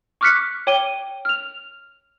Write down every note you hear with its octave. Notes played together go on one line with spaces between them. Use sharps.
C#6 D6 F6 F#6 B6 C#7
C#5 G5 D6 D#7 G7
F6 F7